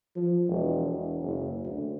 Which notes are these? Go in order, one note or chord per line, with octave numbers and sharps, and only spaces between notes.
F3
E1
E1
F#1
D2